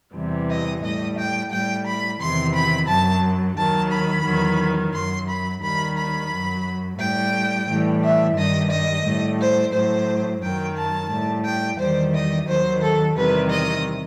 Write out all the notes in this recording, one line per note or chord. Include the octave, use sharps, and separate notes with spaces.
E2 C3 E3 G3
D#5
A2 G3 D#5
G5
A2 G3 G5
B5
E2 C3 D#3 C6
B5
F#2 F#3 A5
D#2 D#3 F#3 A5
B5
E2 D#3 F#3
F#2 F#3 C6
B5
D#2 D#3 G3 B5
B5
F#2 F#3
A2 G3 G5
A2 E3 G3
E5
G2 D#3 G3 D#5
D#5
A2 G3
C5
A2 F#3 C5
F#2 D#3 F#3 G5
A5
A2 G3
G5
E2 D#3 G3 C5
D#5
D#2 D#3 F#3 C5
A4
E2 C3 D#3 G3 B4
D#5